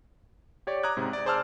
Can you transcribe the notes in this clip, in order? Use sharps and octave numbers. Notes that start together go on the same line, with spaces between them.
G4 C#5 D5
A#5 D6 D#6 F#6 G#6
G#2 C3
D5
G#4 C5 D5 A5 E6 F6